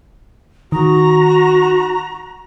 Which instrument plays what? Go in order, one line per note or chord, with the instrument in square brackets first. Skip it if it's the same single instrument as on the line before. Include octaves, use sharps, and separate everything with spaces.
[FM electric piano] D#3 [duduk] F#4 [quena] A#5